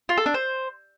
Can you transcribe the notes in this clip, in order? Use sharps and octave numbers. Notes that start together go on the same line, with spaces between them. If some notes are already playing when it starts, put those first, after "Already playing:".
F4
A4
D4
C5